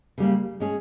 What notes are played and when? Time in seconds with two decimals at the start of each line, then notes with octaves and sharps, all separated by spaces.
0.18 C#3 G3 A#3
0.60 G#3 C#4 G#4